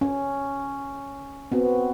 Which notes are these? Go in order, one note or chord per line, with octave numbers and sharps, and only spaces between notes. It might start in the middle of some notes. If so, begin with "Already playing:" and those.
C#4
B3 C4 F#4